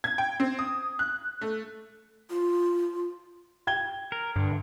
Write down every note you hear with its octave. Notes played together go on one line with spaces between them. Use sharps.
G#6
G5
C4
D#6
F#6
A3
F4
G5 G#6 G7
A#4
G2 D3